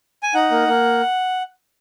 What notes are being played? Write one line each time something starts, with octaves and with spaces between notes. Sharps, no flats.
G#5
D#4 F#5
A#3
A#3